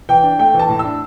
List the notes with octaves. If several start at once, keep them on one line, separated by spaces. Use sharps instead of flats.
E3 G5
D4
A3 G5
E3
A5
A2
E6
D4